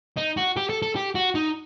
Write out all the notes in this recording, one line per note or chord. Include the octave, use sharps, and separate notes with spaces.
D#4
F#4
G4
A4
A4
G4
F#4
D#4